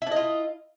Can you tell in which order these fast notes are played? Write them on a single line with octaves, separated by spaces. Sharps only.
E4 D4 D#5 F4